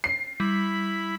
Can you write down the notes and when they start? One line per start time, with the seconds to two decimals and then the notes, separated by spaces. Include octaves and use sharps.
0.04 C7
0.40 G3 E4 B5